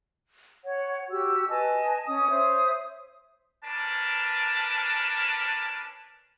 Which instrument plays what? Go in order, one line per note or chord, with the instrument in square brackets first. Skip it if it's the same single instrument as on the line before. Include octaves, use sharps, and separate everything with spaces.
[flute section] C#5 F#5
F#4 G4 E6
B4 D#5 G#5 A5
C#4 D#6
C5 C#5 E5 D#6
[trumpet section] C#4 D4 A#4 B4 A5